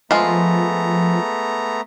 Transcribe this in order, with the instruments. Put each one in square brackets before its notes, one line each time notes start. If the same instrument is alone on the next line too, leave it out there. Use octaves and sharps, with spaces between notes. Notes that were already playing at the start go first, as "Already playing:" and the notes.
[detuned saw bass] F3 [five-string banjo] G#3 F4 [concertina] A3 B3 A#5